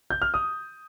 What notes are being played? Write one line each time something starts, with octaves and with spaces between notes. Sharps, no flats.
G6
F6
D#6